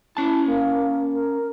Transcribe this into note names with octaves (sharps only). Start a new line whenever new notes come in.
C#4 E4 A5
A#3
A#4